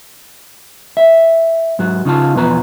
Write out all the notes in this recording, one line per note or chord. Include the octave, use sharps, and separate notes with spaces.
E5
G#2 F#3 F#4
C#3 D#4 F4 A5
E2 B2 F3 B4 A#5